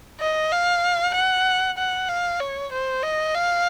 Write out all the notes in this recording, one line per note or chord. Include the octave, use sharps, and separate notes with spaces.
D#5
F5
F#5
F#5
F5
C#5
C5
D#5
F5